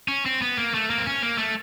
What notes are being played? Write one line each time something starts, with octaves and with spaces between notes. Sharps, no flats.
C#4
C4
B3
A#3
A3
A#3
C4
C#4
A#3
A3